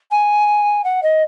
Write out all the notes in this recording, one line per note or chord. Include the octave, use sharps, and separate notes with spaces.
G#5
F#5
D#5